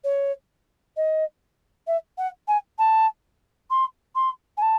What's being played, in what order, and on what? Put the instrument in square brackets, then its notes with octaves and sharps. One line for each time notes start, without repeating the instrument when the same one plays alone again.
[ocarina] C#5
D#5
E5
F#5
G#5
A5
C6
C6
G#5
A5